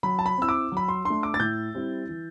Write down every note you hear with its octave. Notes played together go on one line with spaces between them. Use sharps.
F#3 B5
A5
B5
C4 E4 E6
D6
F#3 B5
C6
A3 D4 C6
D6
A6
A2 G6
G3 C4 E4
E3